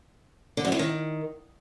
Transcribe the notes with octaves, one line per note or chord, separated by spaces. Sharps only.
D3
F#2
E3
D#3